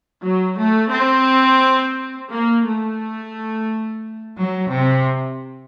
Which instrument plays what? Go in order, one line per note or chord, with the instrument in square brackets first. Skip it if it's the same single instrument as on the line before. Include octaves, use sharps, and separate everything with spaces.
[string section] F#3
A3
C4
A#3
A3
F#3
C3